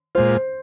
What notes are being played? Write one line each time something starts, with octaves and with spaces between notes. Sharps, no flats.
A#2 G#3 F4 C5